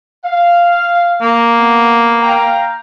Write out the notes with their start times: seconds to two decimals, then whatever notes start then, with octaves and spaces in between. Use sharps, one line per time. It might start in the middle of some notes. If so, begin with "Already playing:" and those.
0.24 F5
1.22 A#3
1.59 B3
2.22 F5 G5 A#5